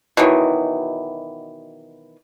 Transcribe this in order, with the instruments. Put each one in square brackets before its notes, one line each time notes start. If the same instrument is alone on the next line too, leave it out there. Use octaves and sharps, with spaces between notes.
[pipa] B2 D#3 E3 F#3